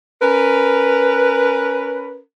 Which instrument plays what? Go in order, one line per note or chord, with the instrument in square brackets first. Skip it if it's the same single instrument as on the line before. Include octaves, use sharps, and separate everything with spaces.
[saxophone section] C#4 A#4 B4